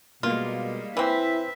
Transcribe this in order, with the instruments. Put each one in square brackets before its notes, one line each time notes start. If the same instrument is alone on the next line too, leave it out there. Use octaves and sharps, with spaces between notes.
[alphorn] B2 [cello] G3 G#3 [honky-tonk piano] A#3 [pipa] F4
[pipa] E3 C4 [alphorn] E4 [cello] B4 E5